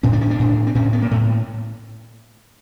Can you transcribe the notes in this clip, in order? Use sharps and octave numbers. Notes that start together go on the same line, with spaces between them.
A2 C#4
D4
C#4
D4
A2
C4
A2 C#4
B3
A#3
A2 A3